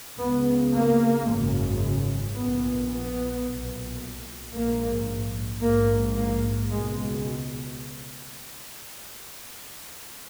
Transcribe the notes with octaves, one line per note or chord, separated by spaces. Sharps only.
C#2 C#3 B3
A#3
G#1 F#2 C#3
A#1 A#2 B3
B3
B1 A#2
A#1 G#2 A#3
A#1 G#2 A#3
A#3
C#2 B2 G#3